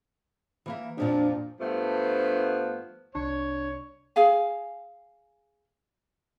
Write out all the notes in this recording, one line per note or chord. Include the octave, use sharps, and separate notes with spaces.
E3 A#3 E5
F2 A#2 F3 D4
G2 F3 A3 B3
C2 D4 C#5
G#4 F5 G#5